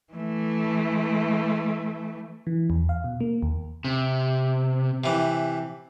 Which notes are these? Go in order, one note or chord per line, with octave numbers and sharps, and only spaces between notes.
E3 A3
E3
E2
F5
B2
A#3
D#2
C3
C3 E3